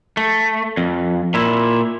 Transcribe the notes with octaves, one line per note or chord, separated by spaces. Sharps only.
A3
F2
A#2 E4